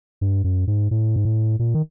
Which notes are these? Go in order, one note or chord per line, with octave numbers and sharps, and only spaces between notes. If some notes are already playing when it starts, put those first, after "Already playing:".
G2
F#2
G#2
A2
G#2
A2
A#2
D#3